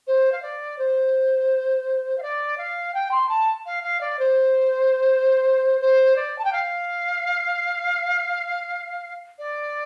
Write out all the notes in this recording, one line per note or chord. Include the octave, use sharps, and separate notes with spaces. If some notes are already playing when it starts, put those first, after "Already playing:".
C5
F5
D5
C5
F5
D5
F5
G5
C6
A5
F5
F5
D5
C5
C5
D5
A5
G5
F5
D5